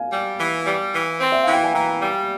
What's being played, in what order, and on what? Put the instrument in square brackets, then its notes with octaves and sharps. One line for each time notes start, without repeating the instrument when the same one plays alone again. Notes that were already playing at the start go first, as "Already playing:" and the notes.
Already playing: [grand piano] F5 G#5
[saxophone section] G3
E3
G3
E3
C4
[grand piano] E5
[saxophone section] E3 [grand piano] F5
[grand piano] G5
G#5
[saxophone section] E3 [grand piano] G5 A#5
[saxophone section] G3